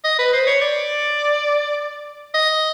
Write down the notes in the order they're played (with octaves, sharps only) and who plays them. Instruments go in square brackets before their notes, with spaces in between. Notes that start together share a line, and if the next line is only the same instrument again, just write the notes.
[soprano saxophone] D#5
B4
C5
C#5
D5
D#5